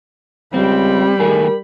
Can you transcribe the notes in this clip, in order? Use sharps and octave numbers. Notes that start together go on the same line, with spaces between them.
C#2 G3 C4 B5
D#3 A3 G#4 A#4